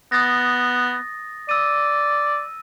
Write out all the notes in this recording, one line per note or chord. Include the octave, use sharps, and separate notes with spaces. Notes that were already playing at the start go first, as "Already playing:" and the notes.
B3 D#6 A6 A#6
D5 E6 D#7